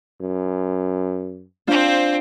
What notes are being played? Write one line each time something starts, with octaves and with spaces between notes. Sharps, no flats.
F#2
C4 D4 F4 C5